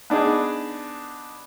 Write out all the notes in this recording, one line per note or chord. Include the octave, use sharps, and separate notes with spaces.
B3 D4 D#4 G#4